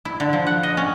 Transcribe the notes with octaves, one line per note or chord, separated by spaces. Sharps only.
E4
D3
F3
F#5
D#5
C#4